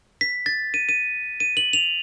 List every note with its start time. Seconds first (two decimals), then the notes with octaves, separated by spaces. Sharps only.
0.21 B6
0.46 A6
0.74 D#7
0.89 D#7
1.40 D#7
1.57 F#7
1.73 F7